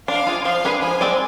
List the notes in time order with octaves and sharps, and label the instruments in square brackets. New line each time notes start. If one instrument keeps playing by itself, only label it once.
[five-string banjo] D4 [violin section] F5
[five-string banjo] F4 G#4
[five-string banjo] F3 [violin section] F5
[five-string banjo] G#3 D4 G#4 B4
[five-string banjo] F3 [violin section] G#5
[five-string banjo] G#3 C4 G#4 D5